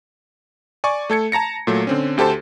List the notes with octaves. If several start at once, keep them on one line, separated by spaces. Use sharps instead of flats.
D5 G#5 C#6 D6
A3 A4 G#6 C#7
A5 A#5 A#6 C#7
A#2 F#3 A3
D3 C4 C#4
D2 G4 A4 C5 A5